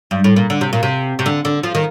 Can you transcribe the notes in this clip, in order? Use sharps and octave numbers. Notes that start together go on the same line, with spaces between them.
G2
A2
A#2
D3
C3
A#2
C3
C3
D3
D3
F3
D#3